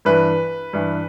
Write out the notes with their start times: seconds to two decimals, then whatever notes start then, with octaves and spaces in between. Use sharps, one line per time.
0.05 G2 E3 B4
0.73 G2 E3